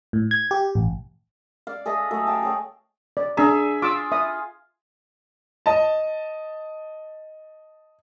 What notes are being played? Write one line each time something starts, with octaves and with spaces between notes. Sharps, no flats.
A2
G#6
G4
A1
D5 F5
G#4 A4 D#5 E5
F#3 A3
F5 G5 A5
G#4 C#5 G5
D5
D4 G#4 E5 A#5
F4 D6 E6
E5 D#6
D#5 A5